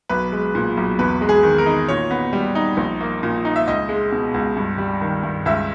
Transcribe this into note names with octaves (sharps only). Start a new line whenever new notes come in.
B1 B4
G#3
A#2
B1
E2 B4
G#3
G#4
D#3
A#4
D#4
A#2 C#5
B3
G3
D#4
A#1
A#3
A#2
D#4
E5
C#2 D#5
G#3
B2
C#2
G2
G3
D#3
G2
C#2 E5